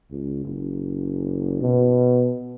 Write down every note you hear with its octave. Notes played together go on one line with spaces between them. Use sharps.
C#2
F#1
B2